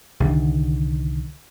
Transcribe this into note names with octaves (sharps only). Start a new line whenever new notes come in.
C2 D3 D#3